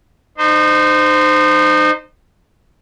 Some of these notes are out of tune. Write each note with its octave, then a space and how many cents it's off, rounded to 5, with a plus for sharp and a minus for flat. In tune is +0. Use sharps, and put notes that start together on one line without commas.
D#4 -35 C5 -20